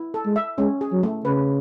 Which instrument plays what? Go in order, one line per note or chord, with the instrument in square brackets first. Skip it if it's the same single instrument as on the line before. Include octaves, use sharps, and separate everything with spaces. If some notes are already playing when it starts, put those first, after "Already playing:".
Already playing: [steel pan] E4
A4
[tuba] G#3
[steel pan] E5
[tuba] G#3 [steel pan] C#4
[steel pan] G#4
[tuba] F#3
[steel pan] A3
[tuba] C#3 [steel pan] B4